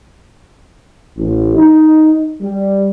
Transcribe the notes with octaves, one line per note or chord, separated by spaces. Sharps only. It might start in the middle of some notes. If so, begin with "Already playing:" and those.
A1
D#4
G3